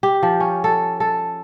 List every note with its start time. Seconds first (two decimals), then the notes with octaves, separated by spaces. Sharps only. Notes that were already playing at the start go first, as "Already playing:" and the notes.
0.03 G4
0.23 F3
0.40 C#4
0.64 A4
1.00 A4